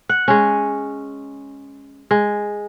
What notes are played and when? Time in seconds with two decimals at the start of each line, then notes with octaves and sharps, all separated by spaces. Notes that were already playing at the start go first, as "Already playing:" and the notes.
0.09 F#5
0.28 G#3 C#4
2.11 G#3